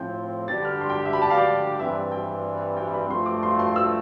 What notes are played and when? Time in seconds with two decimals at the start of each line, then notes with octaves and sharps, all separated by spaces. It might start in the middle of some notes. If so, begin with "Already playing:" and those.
Already playing: A2 F3 C4 G6
0.48 D3 G3 D4 G4 A6
0.65 F6
0.81 C6
0.90 G5
1.05 E5
1.13 B5
1.22 A5
1.30 F5
1.38 D5
1.79 G2 E3 G3 C4 E5
2.12 G5
2.77 G5
2.94 B5
3.09 G2 F3 A3 C4 F4 C6
3.26 D6
3.43 C6
3.59 C6
3.76 E6